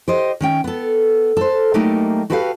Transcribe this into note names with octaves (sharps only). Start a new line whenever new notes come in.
G4 C5 D#5
D#3 C#4 G5
B3 A4
A4 C5
F#3 G3 A3 A#3 D#4 G4
F#4 G4 A4 B4 D#5 F5